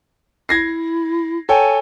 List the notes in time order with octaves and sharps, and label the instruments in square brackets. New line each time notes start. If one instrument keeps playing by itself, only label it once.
[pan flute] E4 [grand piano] G#6 A#6 C7
[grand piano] A4 C#5 G5 [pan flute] G#5